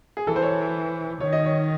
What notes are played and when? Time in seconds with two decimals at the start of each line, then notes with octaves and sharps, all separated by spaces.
0.17 G#4
0.27 E3 A4
0.36 C5
0.42 C#5
1.20 D#3 C#5
1.33 D#5
1.45 C#5